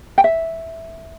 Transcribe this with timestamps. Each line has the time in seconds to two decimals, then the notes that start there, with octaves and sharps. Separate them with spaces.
0.18 G5
0.24 E5